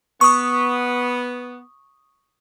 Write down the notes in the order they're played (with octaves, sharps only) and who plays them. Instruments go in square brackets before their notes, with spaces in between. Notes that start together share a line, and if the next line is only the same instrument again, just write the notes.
[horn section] B3 [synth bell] C#6 D#6